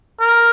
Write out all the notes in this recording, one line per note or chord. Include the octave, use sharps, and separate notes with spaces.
A#4